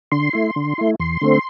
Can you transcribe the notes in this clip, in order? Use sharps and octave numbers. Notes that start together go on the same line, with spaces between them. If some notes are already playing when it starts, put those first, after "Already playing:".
D3 C6
A3 E4
D3
A3 E4
E2 C6
D3 A3 C4